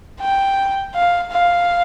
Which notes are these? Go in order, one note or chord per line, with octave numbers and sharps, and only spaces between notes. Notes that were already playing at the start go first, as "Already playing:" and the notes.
G5
F5
F5